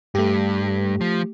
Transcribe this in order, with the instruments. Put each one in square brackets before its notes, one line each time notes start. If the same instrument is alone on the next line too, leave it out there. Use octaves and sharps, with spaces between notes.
[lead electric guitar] G2 [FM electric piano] A3 G4
[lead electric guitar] F3